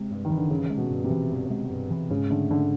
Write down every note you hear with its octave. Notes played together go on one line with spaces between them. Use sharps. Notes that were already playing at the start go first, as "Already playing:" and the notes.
Already playing: C3 G#3
G2
D#3
E3
D3
G2 C#3
G#3
B2
G2
C3
E3
G2
G#3
G2
E3
G#2 C#3
D3 A3
G#2 D3